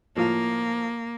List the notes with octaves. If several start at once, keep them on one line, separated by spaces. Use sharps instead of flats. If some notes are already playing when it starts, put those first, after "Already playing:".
A2 F3 A#3 F4